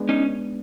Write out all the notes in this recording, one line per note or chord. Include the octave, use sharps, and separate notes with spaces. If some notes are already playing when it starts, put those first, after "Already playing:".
Already playing: G#3 B3 D4
C#4 D#4